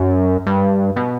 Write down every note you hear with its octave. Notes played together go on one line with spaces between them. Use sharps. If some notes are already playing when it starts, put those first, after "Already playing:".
Already playing: F#2
G2
B2